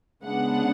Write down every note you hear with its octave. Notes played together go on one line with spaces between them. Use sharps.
C#3 G#3 B3 D4 F#5